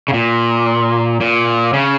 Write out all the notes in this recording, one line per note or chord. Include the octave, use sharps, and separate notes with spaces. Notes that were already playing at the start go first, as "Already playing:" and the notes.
C#3
A#2
A#2
C#3